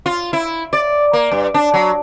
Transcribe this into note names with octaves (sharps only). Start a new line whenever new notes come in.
F4
E4
D5
A#3
G2
D4
F#3